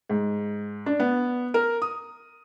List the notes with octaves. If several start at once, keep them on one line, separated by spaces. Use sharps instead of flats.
G#2
D4
B3
A#4
D#6